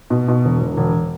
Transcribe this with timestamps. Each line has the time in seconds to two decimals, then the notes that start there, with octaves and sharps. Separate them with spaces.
0.10 B2
0.28 B2
0.45 E1
0.61 E1
0.77 E1